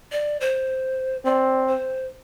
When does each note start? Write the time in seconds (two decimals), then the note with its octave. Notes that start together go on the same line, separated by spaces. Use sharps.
0.12 D5
0.41 C5
1.25 C4 D5
1.68 C5